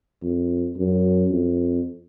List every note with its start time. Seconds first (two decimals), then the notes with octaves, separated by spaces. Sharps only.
0.23 F2
0.77 F#2
1.31 F2